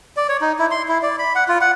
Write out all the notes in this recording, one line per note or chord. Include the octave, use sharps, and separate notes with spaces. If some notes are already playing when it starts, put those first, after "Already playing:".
D5
C#5
D#4
E4
C6
E4
D5
B5
F#5
F4
F#5